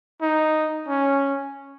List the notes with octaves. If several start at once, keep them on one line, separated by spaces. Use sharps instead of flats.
D#4
C#4